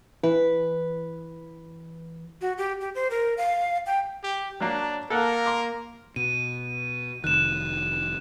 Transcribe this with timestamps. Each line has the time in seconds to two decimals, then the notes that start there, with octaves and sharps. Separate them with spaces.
0.23 E3 B4
2.41 F#4
2.58 G4
2.81 G4
2.95 C5
3.10 A#4
3.38 F5
3.86 G5
4.23 G4
4.61 F#3 A#3 D4
5.10 A#3 A4 A#4 F#5
5.46 C6 D6
6.16 B2 D#7
7.24 F1 B1 D#3 F#6 E7